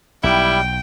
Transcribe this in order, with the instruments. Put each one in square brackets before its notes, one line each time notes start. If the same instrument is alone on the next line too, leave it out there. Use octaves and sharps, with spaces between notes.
[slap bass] B1 [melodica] G3 [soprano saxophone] E4 [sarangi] G5